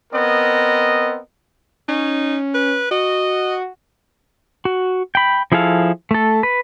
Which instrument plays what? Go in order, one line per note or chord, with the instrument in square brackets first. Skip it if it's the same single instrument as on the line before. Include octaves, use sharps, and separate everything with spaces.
[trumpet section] B3 C4 A#4 D#5
[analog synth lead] C#4 [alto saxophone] D#4
[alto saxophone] B4
[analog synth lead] F#4 [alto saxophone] D#5
[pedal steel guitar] F#4
G5 B5
F3 E4 G#4 A4 F5
A3 A4
B4